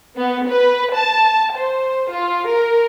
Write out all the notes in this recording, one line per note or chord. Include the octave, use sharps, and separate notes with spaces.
B3
B4
A5
C5
F4
A#4